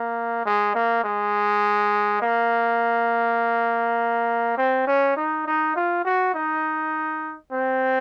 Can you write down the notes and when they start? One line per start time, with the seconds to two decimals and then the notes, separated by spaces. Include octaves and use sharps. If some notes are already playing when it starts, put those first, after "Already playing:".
Already playing: A#3
0.46 G#3
0.75 A#3
1.04 G#3
2.22 A#3
4.58 C4
4.87 C#4
5.17 D#4
5.47 D#4
5.76 F4
6.05 F#4
6.34 D#4
7.52 C4